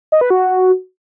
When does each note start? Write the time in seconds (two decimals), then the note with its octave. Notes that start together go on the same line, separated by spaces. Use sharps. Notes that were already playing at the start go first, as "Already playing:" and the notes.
0.12 D#5
0.21 B4
0.30 F#4